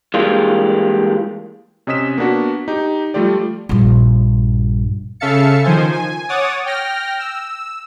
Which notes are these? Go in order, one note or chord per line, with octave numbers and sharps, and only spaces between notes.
E3 G3 G#3 A#3 D4 F4
C3 C#4 D#5 D#6 B6 E7
A#3 B3 D4 F#4
D#4 G4
F3 G3 A3 F4 G4 D5
A#1 G2
C#3 A4 E5 F5 A6 C#7
D#3 F3 C5 G#5
G#5
C#5 F#5 D6 D#6 A6
G5 F6 A#6
E6